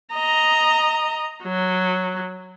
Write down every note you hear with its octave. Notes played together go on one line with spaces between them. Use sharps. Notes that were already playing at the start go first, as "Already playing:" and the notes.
D#5 A#5
F#3